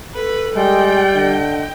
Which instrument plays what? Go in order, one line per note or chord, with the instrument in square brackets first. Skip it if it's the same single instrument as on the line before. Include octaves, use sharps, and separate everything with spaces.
[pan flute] A4 [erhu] B4
[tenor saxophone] G3 [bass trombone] G#3 [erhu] G5
[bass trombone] D3 [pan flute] D#5